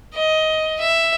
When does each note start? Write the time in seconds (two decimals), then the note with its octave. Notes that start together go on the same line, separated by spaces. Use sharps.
0.14 D#5
0.80 E5